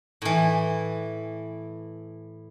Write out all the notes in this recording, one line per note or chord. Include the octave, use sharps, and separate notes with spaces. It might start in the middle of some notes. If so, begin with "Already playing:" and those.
A2 E3